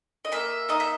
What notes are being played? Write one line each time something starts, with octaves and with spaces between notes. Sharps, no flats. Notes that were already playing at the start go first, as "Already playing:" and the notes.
D#5
A#3 E5
D#4 D#5
E5